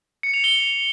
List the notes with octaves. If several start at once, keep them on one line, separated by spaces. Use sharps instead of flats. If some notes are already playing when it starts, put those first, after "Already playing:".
C#7
F7
G7